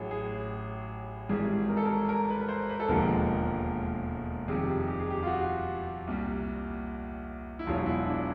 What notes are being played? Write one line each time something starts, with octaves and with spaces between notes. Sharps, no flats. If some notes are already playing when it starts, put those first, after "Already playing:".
Already playing: A1 A2 F#3 G#4
G#4
G#1 G#2 E3 G3 G#4
A#4
A4
A#4
A#4
B4
C5
B4
A4
E1 D#2 D3 F3 G#3 A#4
F2 C3 D#3 G3 G#4
G4
G#4
G4
F4
F#4
C2 A#2 G3
E4
E1 E2 B2 F#3 F4
E4
D4